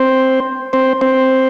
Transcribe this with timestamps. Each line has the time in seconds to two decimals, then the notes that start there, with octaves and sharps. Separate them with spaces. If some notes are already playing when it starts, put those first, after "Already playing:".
Already playing: C4 C5
0.73 C4 C5
1.01 C4 C5